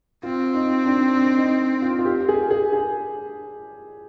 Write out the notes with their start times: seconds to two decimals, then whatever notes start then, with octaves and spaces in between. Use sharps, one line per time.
0.23 C4 F4
0.54 D#4
0.85 D4
1.14 D4
1.37 D#4
1.82 F4
1.99 F4
2.05 G4
2.29 G#4
2.51 G#4
2.73 G#4